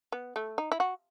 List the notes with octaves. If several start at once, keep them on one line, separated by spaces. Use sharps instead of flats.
B3
A3
D#4
E4
F#4